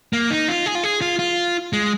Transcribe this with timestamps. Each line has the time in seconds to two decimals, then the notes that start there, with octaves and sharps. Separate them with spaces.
0.13 A#3
0.31 D#4
0.48 F4
0.66 G#4
0.75 F4
0.84 G#4
1.01 F4
1.19 F4
1.73 G#3